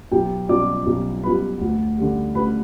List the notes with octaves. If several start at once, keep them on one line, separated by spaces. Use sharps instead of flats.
B1 G4 G5
B2 G3 B3 D5 D6
B1
B2 G3 B3 B4 B5
D2
D3 G3
D2 B4 B5